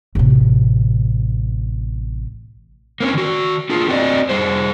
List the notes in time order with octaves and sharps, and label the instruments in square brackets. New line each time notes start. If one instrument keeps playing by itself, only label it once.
[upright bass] A1 C3
[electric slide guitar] A#3 C4 C#4
D#3 F#4
D4 F4 G#4
C4 F#4 D5 D#5
G3 G#4 C5